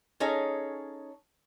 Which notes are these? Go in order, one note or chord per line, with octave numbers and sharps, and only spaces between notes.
C#4 D#4 G#4 A4 C#5 D#5